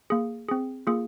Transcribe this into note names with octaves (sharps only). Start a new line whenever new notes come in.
A#3 G#4
C4 G#4
A#3 F4 G#4